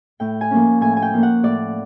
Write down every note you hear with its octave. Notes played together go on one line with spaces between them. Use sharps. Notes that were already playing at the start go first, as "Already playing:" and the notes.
A2 G5
G#5
F3 A#3 C#4
A2 G#5
G#5
G5
F3 A#3 C#4
F#5
A2 D5